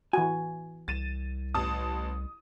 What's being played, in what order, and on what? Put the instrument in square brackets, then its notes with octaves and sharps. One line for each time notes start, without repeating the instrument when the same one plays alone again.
[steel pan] E3 F#4 [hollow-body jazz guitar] G#5
[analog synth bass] C2 [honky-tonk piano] A6 D#7 E7
[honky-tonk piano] A1 A5 D#6